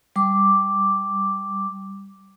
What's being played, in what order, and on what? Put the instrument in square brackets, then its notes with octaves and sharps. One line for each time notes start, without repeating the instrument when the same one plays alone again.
[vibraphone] G3 D6